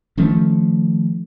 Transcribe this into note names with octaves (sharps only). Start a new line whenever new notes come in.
D#3 F3 A3 C#4